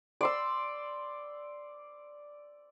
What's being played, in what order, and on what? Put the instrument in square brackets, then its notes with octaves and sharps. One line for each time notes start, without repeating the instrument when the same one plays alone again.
[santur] D5 C6 E6